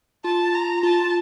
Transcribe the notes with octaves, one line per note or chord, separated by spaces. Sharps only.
F4 A5
A#5
F4 A5